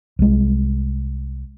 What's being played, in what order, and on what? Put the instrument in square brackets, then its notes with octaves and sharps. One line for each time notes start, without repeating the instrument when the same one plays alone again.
[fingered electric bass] C2 G#3